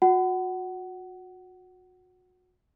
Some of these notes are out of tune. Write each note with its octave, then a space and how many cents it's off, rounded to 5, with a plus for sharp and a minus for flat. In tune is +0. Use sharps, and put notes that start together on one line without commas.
F#4 -30 F#5 +20